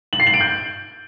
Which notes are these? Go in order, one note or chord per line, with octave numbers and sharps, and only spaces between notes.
F#7
C7
F#7
D7
G6